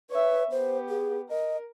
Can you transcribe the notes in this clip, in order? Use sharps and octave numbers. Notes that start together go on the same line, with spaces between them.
B4 C#5 E5
B3 G4 C5
G#4
A#4 D#5